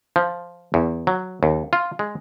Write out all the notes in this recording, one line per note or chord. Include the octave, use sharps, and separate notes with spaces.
F3
E2
F#3
D#2
F4
G#3